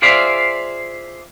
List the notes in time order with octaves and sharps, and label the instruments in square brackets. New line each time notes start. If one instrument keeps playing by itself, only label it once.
[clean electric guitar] F4 G#4 C5 D5 E5 F5